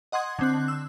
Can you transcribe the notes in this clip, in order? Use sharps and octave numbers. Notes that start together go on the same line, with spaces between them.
D#5 F#5 C6 D#6 G#6
D3 C4 F#6
E6